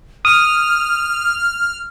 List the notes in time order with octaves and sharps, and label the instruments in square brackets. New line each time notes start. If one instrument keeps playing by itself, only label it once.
[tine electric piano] D#6 [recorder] F6